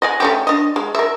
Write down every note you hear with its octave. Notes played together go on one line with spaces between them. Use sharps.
D#5 F#5 G#5
A3 C#4 G4
D4 D#5
G#3
A#4 E5